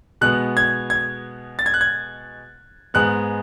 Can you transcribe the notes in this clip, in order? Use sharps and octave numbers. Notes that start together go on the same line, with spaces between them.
B2 G#3 B3 F#6
G#6
G#6
A6
G#6
F#6
G#6
G#2 G#3 B3 F#6